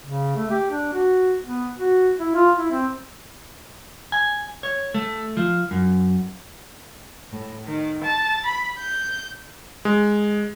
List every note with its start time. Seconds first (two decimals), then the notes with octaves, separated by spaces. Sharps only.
0.04 C#3
0.36 A3
0.51 G4
0.71 D4
0.93 F#4
1.45 B3
1.78 F#4
2.19 E4
2.35 F4
2.57 E4
2.72 C4
4.12 G#5
4.63 C#5
4.94 A3
5.37 F3
5.71 F#2
7.33 A2
7.66 D#3
8.02 A5
8.45 B5
8.78 G6
9.85 G#3